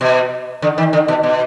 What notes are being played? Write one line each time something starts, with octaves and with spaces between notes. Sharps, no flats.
B2
D3
D#3
D3
B2
B2